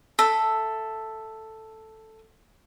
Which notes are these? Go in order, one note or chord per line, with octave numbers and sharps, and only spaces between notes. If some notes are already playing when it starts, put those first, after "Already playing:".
A4 E5